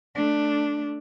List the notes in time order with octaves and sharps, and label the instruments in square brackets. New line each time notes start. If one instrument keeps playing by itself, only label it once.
[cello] A3 D4